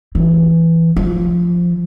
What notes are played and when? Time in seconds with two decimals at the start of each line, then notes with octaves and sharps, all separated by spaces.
0.15 E3
0.96 F3